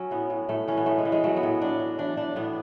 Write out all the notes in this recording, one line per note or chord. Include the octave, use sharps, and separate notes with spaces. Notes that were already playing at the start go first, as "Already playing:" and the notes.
Already playing: F#3 C#4
A2 B3
A2
A2 A3
E3 C#4
B3
A2 A3
G#3
E3
G#3
F#3 A3
B3
A2
F#3 D4
F#3
E3 D4
E3 D4
A2 B3